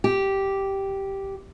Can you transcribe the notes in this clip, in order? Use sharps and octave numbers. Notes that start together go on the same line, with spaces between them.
G4